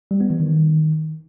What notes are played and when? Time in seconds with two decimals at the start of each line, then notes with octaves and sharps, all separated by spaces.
0.11 G3
0.21 B3
0.30 E3
0.40 D#3